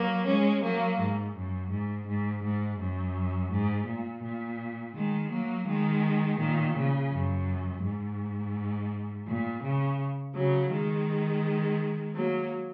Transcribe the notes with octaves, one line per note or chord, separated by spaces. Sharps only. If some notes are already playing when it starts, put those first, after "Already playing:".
Already playing: F#3 A#3
G#3 C#4
F#3 A#3
G#2
F#2
G#2
G#2
G#2
F#2
G#2
A#2
A#2
D#3 G#3
F#3 A#3
D#3 G#3
A#2 D#3
C#3
F#2
G#2
A#2
C#3
C#3 F#3
D#3 G#3
F#3 A#3